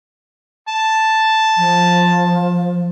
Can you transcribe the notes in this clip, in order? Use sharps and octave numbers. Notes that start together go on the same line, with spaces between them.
A5
F3